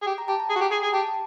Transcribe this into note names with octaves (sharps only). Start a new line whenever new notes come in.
G#4
G4
A#5
G4 A5
A#5
G#4
F#4
G4
G#4
G#4
G4 A5